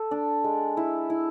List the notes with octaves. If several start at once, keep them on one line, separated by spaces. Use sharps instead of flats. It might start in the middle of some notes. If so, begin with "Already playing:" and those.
Already playing: A4
D4
G#3
E4
E4